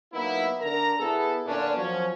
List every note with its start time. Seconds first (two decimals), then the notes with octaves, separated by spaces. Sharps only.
0.13 F#3 A#3 B3 D#4 E4
0.61 D3 A#4 A#5
0.98 B3 E4 G#4 A4
1.46 A#2 D3 A#3 B3 C#4 D4
1.77 F3 F#3 C#4